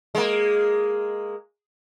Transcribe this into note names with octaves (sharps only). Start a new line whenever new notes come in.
G#3 A#3